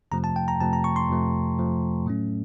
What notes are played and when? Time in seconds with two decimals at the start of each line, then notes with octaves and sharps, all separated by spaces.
0.12 F2 C3 F3 A3 A#5
0.24 A5
0.36 G5
0.48 A#5
0.60 F2 C3 F3 A3 A5
0.73 A#5
0.84 C#6
0.96 C6
1.09 F2 C3 F3 A3
1.58 F2 C3 F3 A3
2.06 A2 F#3 A3 C#4